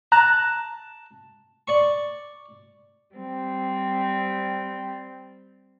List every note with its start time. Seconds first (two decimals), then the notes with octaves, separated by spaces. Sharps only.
0.12 A5 A#5 F#6
1.68 D5 C#6
3.14 G3 C4